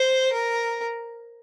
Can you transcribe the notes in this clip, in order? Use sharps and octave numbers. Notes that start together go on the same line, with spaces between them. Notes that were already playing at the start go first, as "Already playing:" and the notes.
Already playing: C5
A#4